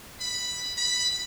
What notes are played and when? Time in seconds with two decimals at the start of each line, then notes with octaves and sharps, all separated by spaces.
0.20 B5
0.77 B5